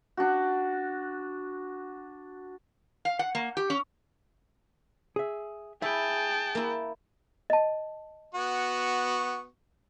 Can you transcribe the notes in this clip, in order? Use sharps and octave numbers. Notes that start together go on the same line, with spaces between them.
D4 F#4
F5
F#5
A#3
G4
C#4
G#4 E5
E4 G#4 E5 G5 A5
A#3 E4
D#5 A5
B3 F#4 C#6